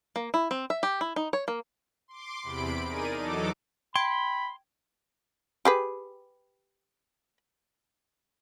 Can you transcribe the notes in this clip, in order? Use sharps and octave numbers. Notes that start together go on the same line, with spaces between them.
A#3
E4
C4
E5
G4
E4
D#4
C#5
A#3
C6 D6
E2 C3 B5 D7
D#4 G#4 A#4 D5 D#7
E2 F#3 D#4 A4 D6
G5 B5 C6 G#6 D7
G4 G#4 B4